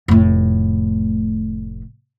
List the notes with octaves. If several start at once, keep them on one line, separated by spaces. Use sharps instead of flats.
F1 A2